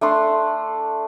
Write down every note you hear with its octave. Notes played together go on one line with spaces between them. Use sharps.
A3 D4 C6